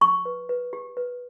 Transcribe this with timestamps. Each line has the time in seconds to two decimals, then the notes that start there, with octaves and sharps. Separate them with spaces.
0.01 G4 C#6
0.25 B4
0.49 B4
0.73 G4
0.97 B4